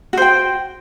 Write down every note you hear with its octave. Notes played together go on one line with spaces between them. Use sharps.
F#4 C5 G5